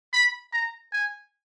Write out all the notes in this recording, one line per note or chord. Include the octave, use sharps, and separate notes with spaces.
B5
A#5
G#5